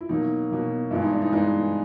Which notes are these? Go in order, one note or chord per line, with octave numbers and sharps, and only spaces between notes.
E4
B2 F#3 A#3 D#4
B2 F#3 A#3
G2 E3 G#3 B3 E4
D#4
D4
D#4
G2 E3 G#3 B3 D#4